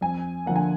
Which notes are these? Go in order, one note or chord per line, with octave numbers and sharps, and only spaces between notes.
F2 G#5
D3 F3 A#3 F#5
G#5